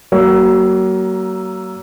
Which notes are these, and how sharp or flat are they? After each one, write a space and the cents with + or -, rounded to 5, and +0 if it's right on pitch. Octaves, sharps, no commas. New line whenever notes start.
F#3 +30 A#3 +0